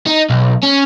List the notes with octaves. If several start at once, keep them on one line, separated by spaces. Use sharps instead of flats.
D#4
B1
C#4